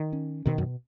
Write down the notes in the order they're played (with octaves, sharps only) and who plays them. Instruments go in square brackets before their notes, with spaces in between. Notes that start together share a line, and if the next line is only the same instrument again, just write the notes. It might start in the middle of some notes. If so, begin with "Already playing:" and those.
Already playing: [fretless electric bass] D#3
[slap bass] C#4
[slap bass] B2 [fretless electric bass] D#3
[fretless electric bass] F#2